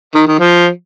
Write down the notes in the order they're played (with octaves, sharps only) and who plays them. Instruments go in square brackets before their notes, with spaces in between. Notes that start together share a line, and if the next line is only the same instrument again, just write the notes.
[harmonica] D#3
D#3
F3